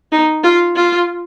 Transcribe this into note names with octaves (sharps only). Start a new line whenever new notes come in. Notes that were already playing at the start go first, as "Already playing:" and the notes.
D#4
F4
F4